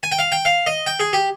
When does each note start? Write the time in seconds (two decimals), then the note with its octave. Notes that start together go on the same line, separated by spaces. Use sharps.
0.03 G#5
0.12 G5
0.19 F5
0.32 G5
0.45 F5
0.67 D#5
0.86 G5
1.00 G#4
1.13 G4